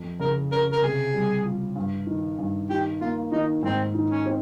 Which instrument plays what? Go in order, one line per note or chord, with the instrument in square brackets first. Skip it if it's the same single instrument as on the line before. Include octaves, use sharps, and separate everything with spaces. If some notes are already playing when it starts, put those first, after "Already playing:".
Already playing: [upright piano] F2
[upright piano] C#3 [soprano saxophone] A#4
[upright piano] C#4 [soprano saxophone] A#4
[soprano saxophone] A#4
[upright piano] C3 [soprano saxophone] G#4
[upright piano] G3
F4
G2
D#3
G2
[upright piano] D#3 [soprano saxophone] G4
[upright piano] A#3 [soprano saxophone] F4
[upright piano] D#3 [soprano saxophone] D#4
[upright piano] G#2 [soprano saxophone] C4
[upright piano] D#3
[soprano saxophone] C#4
[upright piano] C4